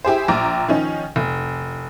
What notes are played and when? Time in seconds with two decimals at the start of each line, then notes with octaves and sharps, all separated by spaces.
0.05 E4 G4 G#4 C5
0.28 A#1 G5 A#5 D6
0.68 D#3 F3 C#4 D#4
1.16 F1